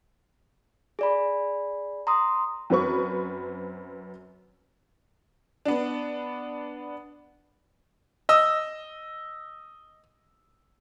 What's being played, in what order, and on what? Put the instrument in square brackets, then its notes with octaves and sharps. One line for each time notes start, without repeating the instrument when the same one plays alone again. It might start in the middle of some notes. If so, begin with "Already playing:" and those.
[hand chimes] G#4 D5 B5
A#5 C6 D#6
[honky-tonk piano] F#2 C4 B4 C#6
B3 D4
[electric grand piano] D#5 E6